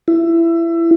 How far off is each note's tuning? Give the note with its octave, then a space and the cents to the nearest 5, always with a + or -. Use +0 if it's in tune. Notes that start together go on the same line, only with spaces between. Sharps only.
E4 +20